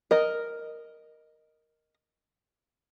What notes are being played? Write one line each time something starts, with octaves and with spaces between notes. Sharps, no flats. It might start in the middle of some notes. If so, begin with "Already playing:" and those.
A#4 D#5